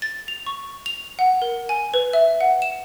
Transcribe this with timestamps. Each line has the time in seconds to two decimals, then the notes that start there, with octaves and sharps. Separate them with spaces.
0.02 A6
0.28 F7
0.46 C#6
0.86 F7
1.19 F#5
1.42 A#4
1.69 G#5
1.94 B4
2.13 E5
2.41 F#5
2.62 E7